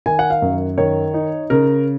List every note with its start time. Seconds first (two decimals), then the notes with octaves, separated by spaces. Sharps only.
0.06 D#3 G#5
0.19 F#5
0.30 F5
0.42 F#2
0.78 D#3 C#5
1.14 D#4
1.50 C#3 A#4